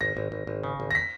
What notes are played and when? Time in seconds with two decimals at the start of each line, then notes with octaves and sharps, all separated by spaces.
0.01 G#1 A#6
0.17 G#1
0.32 G#1
0.47 G#1
0.63 C#3
0.80 G#1
0.91 A#6
0.95 B6